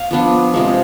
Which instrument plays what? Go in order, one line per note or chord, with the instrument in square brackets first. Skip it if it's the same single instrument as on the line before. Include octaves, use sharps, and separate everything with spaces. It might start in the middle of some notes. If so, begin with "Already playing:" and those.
Already playing: [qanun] F5
F3 B3 D4
C3 F3 G#3